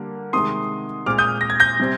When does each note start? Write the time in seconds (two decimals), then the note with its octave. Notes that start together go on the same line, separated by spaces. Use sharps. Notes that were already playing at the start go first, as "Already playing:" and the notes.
Already playing: D3 G3 A#3
0.33 C3 D#3 G#3 C6 D#6
1.06 A#2 G#3 C4 D6 F6
1.18 D#6 G6
1.41 A#6
1.50 G#6
1.60 G6 A#6
1.80 C3 G3 C4